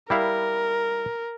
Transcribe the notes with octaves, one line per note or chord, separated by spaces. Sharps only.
G3 E4 A#4 F5